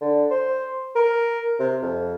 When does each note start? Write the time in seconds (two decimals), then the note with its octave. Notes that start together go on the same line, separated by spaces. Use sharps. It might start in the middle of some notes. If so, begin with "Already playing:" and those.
0.01 D3
0.30 C5
0.95 A#4
1.60 C3
1.82 F2